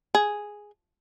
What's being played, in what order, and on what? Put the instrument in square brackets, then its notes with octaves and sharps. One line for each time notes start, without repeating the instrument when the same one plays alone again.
[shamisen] G#4